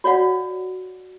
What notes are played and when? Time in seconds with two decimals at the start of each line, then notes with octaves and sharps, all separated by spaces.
0.04 F#4 C#5 D5 F5 F#5